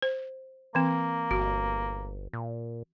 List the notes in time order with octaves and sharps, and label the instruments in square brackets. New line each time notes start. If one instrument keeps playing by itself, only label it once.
[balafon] C5
[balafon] E3 C4 [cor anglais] A#3
[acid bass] G1 [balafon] F#4
[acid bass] A#2